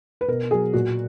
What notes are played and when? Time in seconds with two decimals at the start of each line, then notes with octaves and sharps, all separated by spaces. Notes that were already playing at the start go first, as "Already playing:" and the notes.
0.21 B4
0.28 B2 A#4
0.51 F#3 G#4
0.73 A#2 F#4